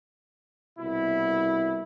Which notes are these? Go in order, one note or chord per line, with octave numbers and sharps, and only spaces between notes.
C2 B2 E4